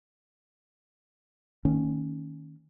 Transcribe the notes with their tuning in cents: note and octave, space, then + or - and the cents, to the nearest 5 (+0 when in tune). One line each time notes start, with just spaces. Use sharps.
D#3 +0 A#3 -35 C#4 +0